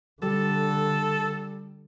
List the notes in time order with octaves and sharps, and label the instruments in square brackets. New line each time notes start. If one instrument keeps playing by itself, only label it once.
[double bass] D3 [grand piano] G3 [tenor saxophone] A4